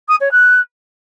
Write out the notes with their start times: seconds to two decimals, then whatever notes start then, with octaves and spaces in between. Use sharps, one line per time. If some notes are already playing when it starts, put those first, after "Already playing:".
0.08 D#6
0.20 C#5
0.32 F#6